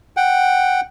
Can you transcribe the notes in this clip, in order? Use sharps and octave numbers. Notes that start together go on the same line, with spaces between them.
F#5 G5